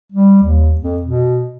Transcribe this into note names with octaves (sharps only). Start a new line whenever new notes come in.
G3
D#2
F2
B2